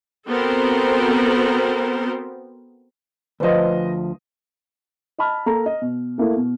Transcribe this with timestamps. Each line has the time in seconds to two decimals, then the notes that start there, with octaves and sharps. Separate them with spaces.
0.28 B3 C4 F#4 A4 A#4 C5
3.40 D2 F3 B4 C5 D#5
5.18 D#5 A5 B5 F6
5.46 A#3 A4 A#5
5.66 D#5
5.81 B2
6.18 A3 A#3 E4
6.36 B2